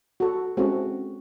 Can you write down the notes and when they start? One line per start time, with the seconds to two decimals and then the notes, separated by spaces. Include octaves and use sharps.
0.20 F#4 A4
0.57 G#3 C4 C#4 E4 F#4 A4